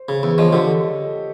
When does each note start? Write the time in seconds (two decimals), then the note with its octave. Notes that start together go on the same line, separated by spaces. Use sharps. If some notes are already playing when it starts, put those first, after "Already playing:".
Already playing: C5
0.09 C#3
0.23 E2
0.38 F3 C#5 D#5
0.53 D3 G4 A4